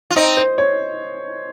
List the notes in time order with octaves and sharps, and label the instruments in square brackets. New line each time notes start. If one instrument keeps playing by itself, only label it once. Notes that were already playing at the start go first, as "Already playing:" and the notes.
[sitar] F4
[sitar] C4 D#4 [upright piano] D#5
[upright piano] C5
C#5